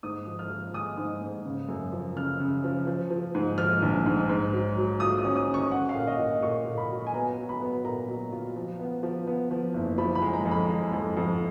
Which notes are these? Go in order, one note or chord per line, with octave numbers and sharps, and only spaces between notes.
G#2 D#6
F3
F6
F3
G#3 D#6
G#2
G#2
C#3
F#2
F3
C#3 F6
C#3
F3
F3
F3
G#2
F3 F6
A#1
G#2
G#2
F#3
F#3
F4 D#6
D#6
C#4
D#6
C#4
C#6
C#4 F#5
F5
A#2
D#5
A#2
A#2 C#6
A#2
B5
F#3
G#5
B3 A#5
F#3
B5
B3
A#2 A#5
F#3
F4
F3
B3
F3
B3
F3
F#1
F3 B5
B5
G#3
A#5
F2
B5
G#3
F2
F2